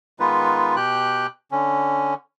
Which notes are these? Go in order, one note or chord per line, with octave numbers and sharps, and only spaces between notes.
D#3 G#3 B3 D#4 F4 B4
B2 G4 G5 F#6
D3 C#4